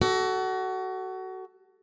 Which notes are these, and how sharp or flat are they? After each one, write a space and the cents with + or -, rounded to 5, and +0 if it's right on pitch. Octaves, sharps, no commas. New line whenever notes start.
F#4 +25 A4 -5